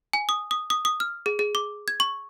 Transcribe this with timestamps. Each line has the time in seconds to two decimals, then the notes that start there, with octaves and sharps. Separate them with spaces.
0.13 G#5
0.29 D#6
0.51 D#6
0.70 D#6
0.85 D#6
1.00 F6
1.26 G#4
1.39 G#4
1.55 D6
1.88 G#6
2.00 C#6